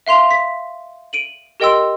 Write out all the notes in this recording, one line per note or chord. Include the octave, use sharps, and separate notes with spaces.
E5 F5 C6 F7
B6
D7 D#7 F#7
G4 A#4 D#5 G5 C6 E6